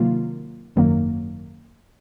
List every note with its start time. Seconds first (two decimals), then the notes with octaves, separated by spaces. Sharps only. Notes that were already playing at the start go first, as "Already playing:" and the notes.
Already playing: C3 D#3 F#3 A#3 F4
0.76 G#1 F#2 D#3 F#3 A#3